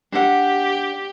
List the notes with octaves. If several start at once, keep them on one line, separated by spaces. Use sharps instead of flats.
D4 G4 F#5